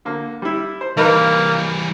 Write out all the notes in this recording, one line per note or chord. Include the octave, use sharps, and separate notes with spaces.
D3 A#3
G3 E4
C5
E3 G3 A#3 D#4 A#4 B4